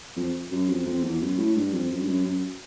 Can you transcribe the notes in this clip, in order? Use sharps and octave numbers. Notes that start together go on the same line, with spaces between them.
F2
F#2
F2
F2
E2
F#2
A2
G2
F2
F#2
G2
F#2
F#2